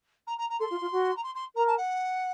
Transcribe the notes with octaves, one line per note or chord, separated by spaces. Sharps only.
A#5
A#5
A#5
A4 C6
F4
F4
F#4
A#5
C6
C6
A#4 A#5
A5
F#5